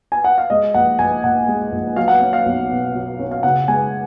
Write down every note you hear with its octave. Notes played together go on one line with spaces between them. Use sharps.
G#5
F#5
F5
G#3 D#5
A#1 F#5
A#1 G#5
A#2 F#5
G#3
A#1
F#3 F5
F#5
C#4 F5
F5
B1
B2
F#3
C#4
F5
C#3 F#5
G#3 G#5